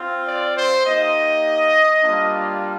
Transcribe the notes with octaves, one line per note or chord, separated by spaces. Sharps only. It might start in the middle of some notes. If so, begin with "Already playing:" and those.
Already playing: C4 F4
D5
C5
A#3 D#4 G4 D#5
G3 A#3 D4 F4